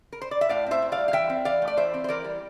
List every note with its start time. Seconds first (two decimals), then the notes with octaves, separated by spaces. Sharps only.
0.13 A#4
0.22 C5
0.31 D5
0.41 E5
0.49 A2 D5 F5
0.67 C4 C5 E5
0.82 A2
0.92 D5 F5
0.98 G3
1.08 F5
1.13 E3 E5 G5
1.30 C4
1.45 E3 D5 F5
1.62 A3
1.68 D5
1.77 E3 C5 E5
1.94 C4
2.04 C5
2.09 E3 A#4 D5
2.25 G3